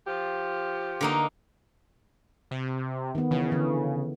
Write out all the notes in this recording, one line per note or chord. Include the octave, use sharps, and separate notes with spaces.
F3 F4 G4
D3 A#3 D#4
C3
D#3 B3
C#3 E3
D3 E3